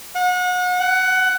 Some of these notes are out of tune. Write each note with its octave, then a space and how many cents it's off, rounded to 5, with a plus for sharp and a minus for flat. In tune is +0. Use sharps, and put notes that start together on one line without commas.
F#5 -35
F#5 +15